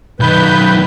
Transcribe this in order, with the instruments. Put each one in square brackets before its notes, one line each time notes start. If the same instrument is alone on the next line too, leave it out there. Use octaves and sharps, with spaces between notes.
[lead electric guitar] B1 D#3 [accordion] B4 G6